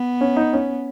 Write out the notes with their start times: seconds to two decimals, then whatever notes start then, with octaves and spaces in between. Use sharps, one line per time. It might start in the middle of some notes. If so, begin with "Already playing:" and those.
Already playing: B3
0.21 C#4
0.37 D#4
0.53 C#4